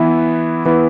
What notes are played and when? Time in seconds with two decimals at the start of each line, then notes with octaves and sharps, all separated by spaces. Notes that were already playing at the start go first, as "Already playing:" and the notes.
Already playing: E3 B3 E4
0.65 E3 B3 E4